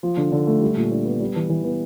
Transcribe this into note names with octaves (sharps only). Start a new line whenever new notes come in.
F3
D3
D3
A3
G3
A#2
D4
B3
G3
E3
E3
B3